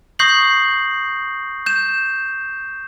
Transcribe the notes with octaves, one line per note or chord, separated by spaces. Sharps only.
C#6 D#6 G6 A#6 C7 F#7
G6 E7